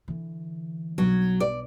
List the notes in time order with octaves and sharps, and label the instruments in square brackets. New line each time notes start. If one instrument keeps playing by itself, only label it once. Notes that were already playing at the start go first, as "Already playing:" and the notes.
[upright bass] D3 E3
[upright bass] B1 D4 [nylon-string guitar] F#3
[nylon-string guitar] D5